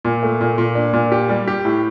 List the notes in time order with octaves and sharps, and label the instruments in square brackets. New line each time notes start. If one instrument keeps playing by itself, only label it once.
[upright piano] A#2
A3
A#2
A#2
D4
A#2
G4
G3
G4
A2